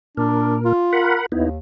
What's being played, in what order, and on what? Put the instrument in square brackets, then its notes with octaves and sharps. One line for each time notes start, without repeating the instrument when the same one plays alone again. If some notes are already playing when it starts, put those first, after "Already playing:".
[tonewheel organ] A#2 A#4 [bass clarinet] D4
[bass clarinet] F4
[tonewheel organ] A#4 F#5 B5
[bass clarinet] D#2 [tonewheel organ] B3 D#4 E4